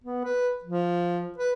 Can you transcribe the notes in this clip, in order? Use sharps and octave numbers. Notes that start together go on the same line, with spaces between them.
B3
B4
F3
B4